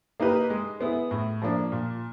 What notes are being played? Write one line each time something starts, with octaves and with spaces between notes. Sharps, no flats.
A#3 D#4 G4 B4
G#3
B3 E4 G#4
A2
F3 A#3 D4
A#2